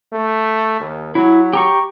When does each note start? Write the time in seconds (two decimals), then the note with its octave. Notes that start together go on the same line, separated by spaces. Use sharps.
0.12 A3
0.80 D#2
1.15 F#3 E4
1.53 G4 A#5 C#6